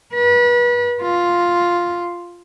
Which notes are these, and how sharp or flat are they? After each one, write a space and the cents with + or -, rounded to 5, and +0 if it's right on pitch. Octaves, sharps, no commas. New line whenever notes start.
B4 -35
F4 +0